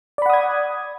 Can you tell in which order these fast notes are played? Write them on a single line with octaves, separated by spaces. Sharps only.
D5 B5 F#5 D#6 G#6